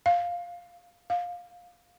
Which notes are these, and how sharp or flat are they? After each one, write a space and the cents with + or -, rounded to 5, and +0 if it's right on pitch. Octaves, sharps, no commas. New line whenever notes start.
F5 +5
F5 +20